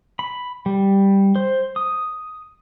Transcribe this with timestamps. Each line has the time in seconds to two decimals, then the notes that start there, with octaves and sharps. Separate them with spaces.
0.19 B5
0.66 G3
1.36 C5
1.76 D#6